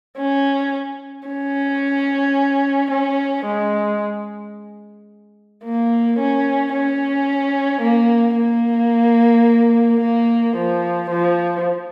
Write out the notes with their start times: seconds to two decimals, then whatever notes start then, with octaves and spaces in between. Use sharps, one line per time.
0.18 C#4
1.28 C#4
2.91 C#4
3.45 G#3
5.64 A#3
6.19 C#4
6.74 C#4
7.82 A#3
8.37 A#3
10.00 A#3
10.56 F3
11.10 F3